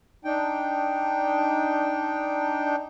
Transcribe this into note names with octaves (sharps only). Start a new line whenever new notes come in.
D4 D#4 G5